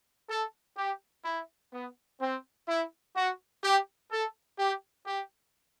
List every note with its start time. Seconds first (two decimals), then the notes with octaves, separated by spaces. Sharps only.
0.29 A4
0.77 G4
1.24 E4
1.72 B3
2.20 C4
2.68 E4
3.15 F#4
3.63 G4
4.10 A4
4.58 G4
5.06 G4